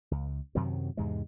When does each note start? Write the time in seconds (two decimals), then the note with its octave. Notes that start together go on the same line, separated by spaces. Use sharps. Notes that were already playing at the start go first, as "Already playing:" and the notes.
0.11 C#2
0.55 F#2 C3 D#3 F#3
0.97 E2 G#2 C3 G#3